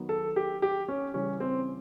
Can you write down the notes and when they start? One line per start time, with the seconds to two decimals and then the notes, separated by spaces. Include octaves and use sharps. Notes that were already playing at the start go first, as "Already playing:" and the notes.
Already playing: D#3 F#3 B3
0.09 A4
0.36 G4
0.62 G4
0.88 C#4
1.14 C#3 E3 G3 C#4
1.40 C4